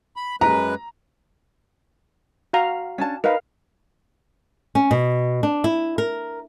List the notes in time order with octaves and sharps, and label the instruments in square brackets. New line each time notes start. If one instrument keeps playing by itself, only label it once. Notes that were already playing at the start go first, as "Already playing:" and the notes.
[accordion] B5
[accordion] F#2 G#3 B4 [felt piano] A#5
[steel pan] F#4 F5 A#5
[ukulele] C#4 D4 A5
[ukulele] D#4 B4 B5 [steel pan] A#4 F5
[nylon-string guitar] C#4
B2
D4
E4
A#4